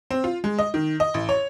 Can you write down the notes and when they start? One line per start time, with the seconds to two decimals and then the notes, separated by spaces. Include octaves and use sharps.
0.11 C4
0.24 F4
0.44 G#3
0.59 D#5
0.74 D#3
1.00 D#5
1.14 A1
1.29 C#5